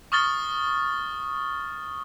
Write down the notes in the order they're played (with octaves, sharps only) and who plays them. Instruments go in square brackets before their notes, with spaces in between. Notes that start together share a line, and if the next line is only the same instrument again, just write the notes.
[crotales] C#6 D#6 F6 A6 G7